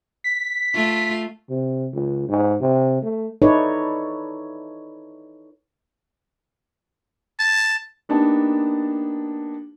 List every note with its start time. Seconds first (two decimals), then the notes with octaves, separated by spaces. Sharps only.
0.24 B6
0.74 A3 F4
1.49 C3
1.94 C#2
2.29 G#2
2.61 C3
3.02 A3
3.42 D#4 E4 A4 B4 C#5 D5
7.39 A5
8.09 A#3 B3 D4 D#4 G4 A5